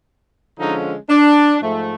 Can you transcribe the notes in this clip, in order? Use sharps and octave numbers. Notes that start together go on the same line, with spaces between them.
D3 F3 G#3 C#4 D#4
D4
G#2 F3 A3